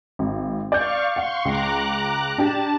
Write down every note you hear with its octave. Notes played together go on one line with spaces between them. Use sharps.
G#1
D5 F5 C#6 G6
F5 F#5 C6 C#6
C#2 A#5 D6 F#6
D4 G4 A5